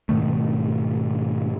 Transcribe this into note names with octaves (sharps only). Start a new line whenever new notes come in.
G#2 B2 D#3 A3